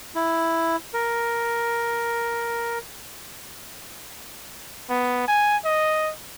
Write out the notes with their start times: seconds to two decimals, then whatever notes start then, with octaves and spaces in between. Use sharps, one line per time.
0.15 E4
0.94 A#4
4.90 B3
5.28 G#5
5.65 D#5